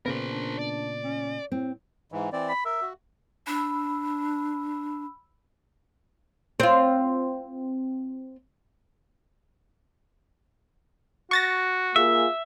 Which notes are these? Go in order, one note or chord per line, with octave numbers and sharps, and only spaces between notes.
A#2 C#3 B3 A#4 C5
D4
D5
C#4
A2 C4
G#2 E3
E3 C4 D5
B5
A#4 E5
F#4
D4 B5 E6
C4 F4
F#4 C#6 A6 A#6
A#3 F4 G#4 E5